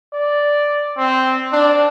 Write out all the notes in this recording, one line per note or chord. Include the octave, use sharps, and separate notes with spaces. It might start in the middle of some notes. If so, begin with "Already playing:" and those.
D5
C4
D4